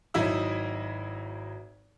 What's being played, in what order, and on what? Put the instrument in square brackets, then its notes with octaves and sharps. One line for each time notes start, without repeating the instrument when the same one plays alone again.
[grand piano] G#1 F#3 D#4 E4 E6